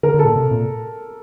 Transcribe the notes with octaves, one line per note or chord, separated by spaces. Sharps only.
D3 A#4
D3
A4
A#2
C3
A#2